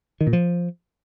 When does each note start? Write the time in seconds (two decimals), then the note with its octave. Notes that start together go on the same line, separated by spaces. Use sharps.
0.21 D#3
0.27 A#2
0.33 F3